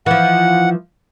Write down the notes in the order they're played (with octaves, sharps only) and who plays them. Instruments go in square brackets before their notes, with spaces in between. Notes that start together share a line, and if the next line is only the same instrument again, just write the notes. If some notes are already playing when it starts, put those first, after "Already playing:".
[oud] E3 F3 [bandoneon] F#5